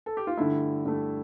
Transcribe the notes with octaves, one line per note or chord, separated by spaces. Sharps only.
A4
G4
F4
G2 D3 A3 E4
G2 D3 A3